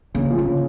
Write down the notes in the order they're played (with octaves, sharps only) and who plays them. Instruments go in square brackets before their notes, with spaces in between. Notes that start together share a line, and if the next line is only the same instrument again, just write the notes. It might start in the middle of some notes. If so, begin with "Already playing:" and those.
[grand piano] C#3 [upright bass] A#3
[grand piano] F3
[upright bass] A#3
[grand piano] C#3